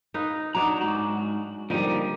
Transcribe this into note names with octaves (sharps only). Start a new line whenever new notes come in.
D#4 B4 F5
F#3 D4 D#4 A#5
G#2 F#4
D3 F3 G3 A#3 D#4